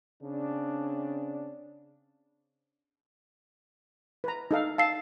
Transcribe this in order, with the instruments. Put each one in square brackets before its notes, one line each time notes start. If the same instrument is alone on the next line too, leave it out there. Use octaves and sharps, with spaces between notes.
[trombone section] C#3 C4 D4
[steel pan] B4 A#5
D#4 A4 F5
[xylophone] F5 E6 C7 [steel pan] A5